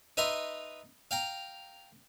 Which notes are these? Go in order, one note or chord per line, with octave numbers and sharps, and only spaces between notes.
D#4 B4 D#5 E5 A#5 C6
F5 G5 A#5